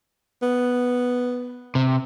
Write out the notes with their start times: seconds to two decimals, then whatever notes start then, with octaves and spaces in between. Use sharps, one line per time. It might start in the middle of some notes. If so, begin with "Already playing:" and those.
0.42 B3
1.75 C3